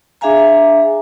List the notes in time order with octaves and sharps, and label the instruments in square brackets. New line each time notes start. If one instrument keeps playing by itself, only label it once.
[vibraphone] D4 G#4 E5 F5 G#5 A#5